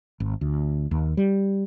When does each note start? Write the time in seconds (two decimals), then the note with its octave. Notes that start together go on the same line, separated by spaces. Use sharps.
0.20 G#1
0.41 D2
0.91 D#2
1.17 G3